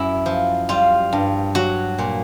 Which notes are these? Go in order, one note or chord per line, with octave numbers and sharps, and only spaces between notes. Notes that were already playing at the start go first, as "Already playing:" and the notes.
Already playing: F#2 E4
F3
G3 F4
G2
F#3 F#4
A#2